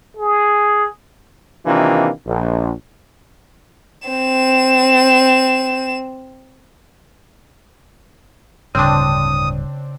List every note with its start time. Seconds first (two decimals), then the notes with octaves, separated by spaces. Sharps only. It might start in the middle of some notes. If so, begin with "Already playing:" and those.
0.17 G#4
1.66 C3 D#3 E3 A#3 D4 F4
2.27 A#1
4.08 C4 E7
8.75 D1 G2 C#3 C4 D4 D#6